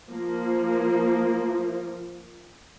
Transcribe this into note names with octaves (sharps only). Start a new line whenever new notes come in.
F3 A#3